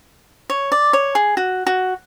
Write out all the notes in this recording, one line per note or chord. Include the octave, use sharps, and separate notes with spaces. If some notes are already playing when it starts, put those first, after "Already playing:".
C#5
D5
C#5
G#4
F#4
F#4